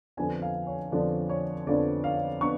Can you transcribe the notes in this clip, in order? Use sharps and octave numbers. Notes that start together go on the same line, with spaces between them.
F2 D3 F3 B3 D4 G#5
F5
C#5
F2 D3 F3 B3 D4 D5
C#5
F2 D3 F3 B3 D4 D5
F5
B3 D4 C#6